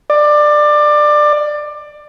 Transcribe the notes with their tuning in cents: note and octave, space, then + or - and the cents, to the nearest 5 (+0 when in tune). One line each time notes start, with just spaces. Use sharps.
D5 +20